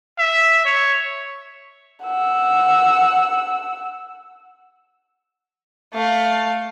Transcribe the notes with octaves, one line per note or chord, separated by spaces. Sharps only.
E5
C#5
F#5 E6
A3 F5